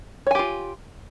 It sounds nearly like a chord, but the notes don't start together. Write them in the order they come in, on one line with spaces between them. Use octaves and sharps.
C#5 G#5 G4 F4